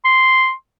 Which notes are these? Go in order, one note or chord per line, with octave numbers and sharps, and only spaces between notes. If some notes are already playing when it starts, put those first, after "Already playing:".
C6